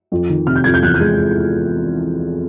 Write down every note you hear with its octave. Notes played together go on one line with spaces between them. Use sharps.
F2
D#3
C3 F6
G6
F2 G#6
G6
E2 F#6
G6
G#3